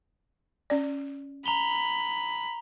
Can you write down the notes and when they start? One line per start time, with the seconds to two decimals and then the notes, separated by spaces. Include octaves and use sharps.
0.70 C#4 D5
1.46 A#5 B5 F7 G7